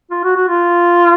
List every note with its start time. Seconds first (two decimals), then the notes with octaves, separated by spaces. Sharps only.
0.11 F4
0.24 F#4
0.36 F#4
0.48 F4